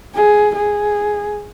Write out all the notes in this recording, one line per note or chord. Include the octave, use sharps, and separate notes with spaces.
G#4
G#4